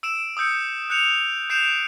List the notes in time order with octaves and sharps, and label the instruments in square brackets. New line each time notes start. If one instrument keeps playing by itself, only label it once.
[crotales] E6 D7 E7
D#6 E6 G6 C#7
F#6 G6 C#7 F7
G6 C7 D7 E7 F7